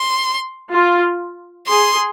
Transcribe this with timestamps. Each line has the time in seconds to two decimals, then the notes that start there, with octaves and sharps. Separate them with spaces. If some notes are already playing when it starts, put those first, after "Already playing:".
Already playing: C6
0.73 F4
1.67 G#4 C6